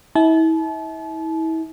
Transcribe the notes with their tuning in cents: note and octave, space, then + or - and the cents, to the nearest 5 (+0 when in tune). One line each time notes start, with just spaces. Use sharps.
E4 -35 A5 -35